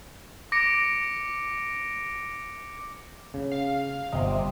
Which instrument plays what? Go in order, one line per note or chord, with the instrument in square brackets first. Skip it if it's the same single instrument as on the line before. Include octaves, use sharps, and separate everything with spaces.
[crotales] D6 A#6 C#7 D7
[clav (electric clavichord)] C#3
[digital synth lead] F5
[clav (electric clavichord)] G1 D#5 [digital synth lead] C3